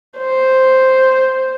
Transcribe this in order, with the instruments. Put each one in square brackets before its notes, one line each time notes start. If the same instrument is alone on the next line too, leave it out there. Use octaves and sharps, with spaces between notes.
[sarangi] C5